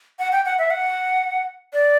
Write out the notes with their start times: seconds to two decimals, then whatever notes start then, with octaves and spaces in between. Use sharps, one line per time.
0.19 F#5
0.32 G5
0.45 F#5
0.58 E5
0.70 F#5
1.73 D5